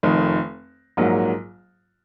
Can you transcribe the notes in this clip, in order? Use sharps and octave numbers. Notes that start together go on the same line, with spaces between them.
F1 F2 D#3
A#1 G#2 F#3 A#3